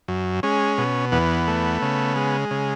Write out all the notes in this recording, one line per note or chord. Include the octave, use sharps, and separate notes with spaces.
F#2
G#3 C#4
B2
E2 B3
A3
C#3
G#3
C#3